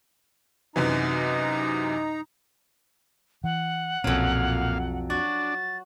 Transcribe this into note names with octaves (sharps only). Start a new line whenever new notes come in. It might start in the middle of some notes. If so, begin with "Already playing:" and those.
F#2 C3 E3 D#4 A#5
E3 F#5
B1 F2 A#2 F#3 C#4 F5
D4 F#4 A6